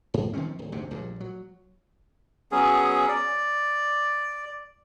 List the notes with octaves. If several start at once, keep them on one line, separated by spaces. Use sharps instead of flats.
G2
D#3 F3 C4 C#4
D1
F1 D2 G#2 C3
A#1 G2 A#2
F#3
F#3 B3 C#4 G#4
D5